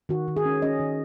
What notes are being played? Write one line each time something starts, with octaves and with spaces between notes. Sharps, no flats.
D#3 F#4
D#3
G#4
C#4
C#4 D#5
D#3